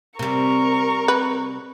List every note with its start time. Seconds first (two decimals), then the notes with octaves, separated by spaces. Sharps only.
0.19 C3 G3 A#4 C#6
1.08 B4